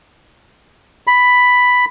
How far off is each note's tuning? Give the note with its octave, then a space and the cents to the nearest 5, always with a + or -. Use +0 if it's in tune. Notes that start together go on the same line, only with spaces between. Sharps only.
B5 +5